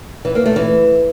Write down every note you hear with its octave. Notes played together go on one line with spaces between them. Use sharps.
E3
A#3
A3
E3